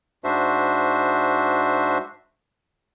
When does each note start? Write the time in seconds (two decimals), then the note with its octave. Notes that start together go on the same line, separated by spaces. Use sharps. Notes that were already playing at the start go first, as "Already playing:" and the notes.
0.24 G#2 D4 F#4 C5 E5